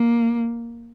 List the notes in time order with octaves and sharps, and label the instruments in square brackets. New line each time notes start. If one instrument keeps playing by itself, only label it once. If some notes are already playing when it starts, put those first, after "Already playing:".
Already playing: [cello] A#3